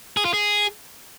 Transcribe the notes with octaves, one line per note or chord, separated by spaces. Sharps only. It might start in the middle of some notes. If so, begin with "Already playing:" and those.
G#4
F4
G#4